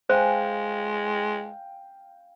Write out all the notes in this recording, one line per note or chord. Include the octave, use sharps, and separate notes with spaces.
G#3 C5 F5 G5 G#5